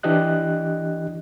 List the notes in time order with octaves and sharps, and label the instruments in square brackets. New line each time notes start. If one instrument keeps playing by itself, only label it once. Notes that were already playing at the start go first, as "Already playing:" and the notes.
[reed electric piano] E3 D4 G4 D#5 F#6